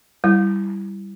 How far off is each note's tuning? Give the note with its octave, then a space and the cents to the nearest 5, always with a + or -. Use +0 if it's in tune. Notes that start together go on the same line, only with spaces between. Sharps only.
G3 +0 E4 +15